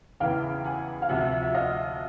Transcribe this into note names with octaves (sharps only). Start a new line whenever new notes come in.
E2 C#3 E3 F5 G5
F#5 G#5
F5
D2 C3 F3 E5 F#5
E5
D#5 F5